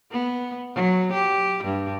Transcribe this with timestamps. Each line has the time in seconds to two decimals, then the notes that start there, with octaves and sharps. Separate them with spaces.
0.11 B3
0.75 F#3
1.13 G4
1.64 G2